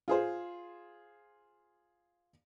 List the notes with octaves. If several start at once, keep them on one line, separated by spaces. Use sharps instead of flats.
F4 G#4 C5